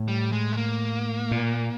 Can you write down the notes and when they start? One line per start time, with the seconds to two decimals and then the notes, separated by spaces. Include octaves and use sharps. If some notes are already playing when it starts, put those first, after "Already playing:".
Already playing: A2
0.08 G3
0.32 G#3
0.52 A3
0.57 A#3
1.31 A#2